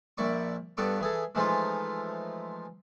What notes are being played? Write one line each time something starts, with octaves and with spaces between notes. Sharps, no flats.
A#1 E4 D5 C#6
G2 B3 A4 D5 C#6
E3 G#4 A4
E3 F3 G#3 A3 D#4 F4